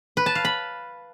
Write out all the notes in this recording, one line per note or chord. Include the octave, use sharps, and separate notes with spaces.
B4
A5
F5
B5